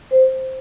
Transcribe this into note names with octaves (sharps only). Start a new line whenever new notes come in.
C5